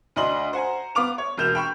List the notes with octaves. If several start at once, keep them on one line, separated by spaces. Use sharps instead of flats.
D2 D4 D#5 C6 F#7
C5 F#5 G#5 A#5
B3 F5 D6 F7
C#5
E1 A#3 G6 E7 F7
G5 B5 C#6